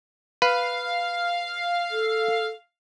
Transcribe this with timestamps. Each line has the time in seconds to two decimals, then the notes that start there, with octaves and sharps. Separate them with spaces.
0.42 B4 F5
1.91 A4